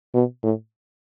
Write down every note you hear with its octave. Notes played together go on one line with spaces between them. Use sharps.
B2
A2